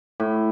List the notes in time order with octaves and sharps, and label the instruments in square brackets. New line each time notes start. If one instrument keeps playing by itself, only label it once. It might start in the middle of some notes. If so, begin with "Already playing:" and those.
[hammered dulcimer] A2